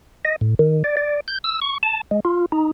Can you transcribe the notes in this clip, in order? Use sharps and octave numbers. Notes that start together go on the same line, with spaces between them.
D#5
A2
D#3
D5
D5
G6
E6
C#6
A5
G#3
F4
D#4